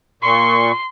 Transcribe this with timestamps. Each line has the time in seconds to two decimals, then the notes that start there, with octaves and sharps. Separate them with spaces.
0.23 A#2 C6 C#6